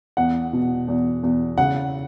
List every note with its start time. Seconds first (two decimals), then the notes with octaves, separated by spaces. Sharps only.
0.17 E2 F#5
0.53 B2
0.88 E2
1.23 E2
1.58 C#3 F#5